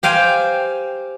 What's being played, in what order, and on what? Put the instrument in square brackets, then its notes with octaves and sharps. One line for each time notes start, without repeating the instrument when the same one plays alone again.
[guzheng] G4 C5 F5 G5 G#5